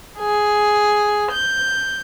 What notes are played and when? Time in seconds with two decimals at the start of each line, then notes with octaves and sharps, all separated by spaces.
0.18 G#4
1.30 G6